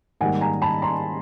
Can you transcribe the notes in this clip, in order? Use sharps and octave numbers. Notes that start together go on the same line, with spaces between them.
G#2 D#3 G3 A#3 F#5 G#5
G#5 A#5
A5 B5
A#5 C6